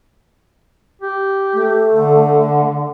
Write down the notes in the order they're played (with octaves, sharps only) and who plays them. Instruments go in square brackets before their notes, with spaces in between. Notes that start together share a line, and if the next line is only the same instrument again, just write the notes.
[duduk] G4
[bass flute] A3
[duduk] D3